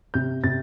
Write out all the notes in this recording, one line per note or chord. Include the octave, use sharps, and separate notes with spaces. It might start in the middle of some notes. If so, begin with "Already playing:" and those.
C3 G6
C3 A6